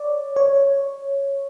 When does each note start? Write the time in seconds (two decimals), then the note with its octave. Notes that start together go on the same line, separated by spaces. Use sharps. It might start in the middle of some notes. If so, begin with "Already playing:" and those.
Already playing: C#5 D5
0.36 C#5